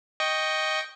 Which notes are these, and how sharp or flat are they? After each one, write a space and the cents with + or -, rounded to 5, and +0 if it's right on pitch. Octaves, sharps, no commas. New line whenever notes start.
D#5 +0 G5 +0 C#6 +0